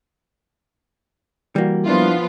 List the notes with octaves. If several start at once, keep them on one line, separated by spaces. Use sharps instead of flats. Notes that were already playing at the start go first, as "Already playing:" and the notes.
E3 G3 A#3 F#4
F3 B3 D4 E4 F4